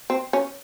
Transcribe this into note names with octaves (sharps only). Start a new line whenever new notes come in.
C4
C#4